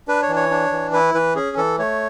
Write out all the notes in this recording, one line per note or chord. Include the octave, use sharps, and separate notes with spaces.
D4 B4
C#5
E3
C#5
D4
E3
E4 B4
E3 B4
C#4 G#4
E3 A4
A3 C#5